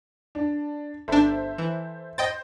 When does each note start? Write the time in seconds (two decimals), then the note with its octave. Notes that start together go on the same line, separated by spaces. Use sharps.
0.35 D4
1.08 G1 D4 A4 C5 E5
1.58 E3
2.18 C5 D#5 G5 A6